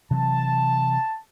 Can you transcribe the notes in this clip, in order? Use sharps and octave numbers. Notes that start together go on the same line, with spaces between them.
C3 E3 F#3 A5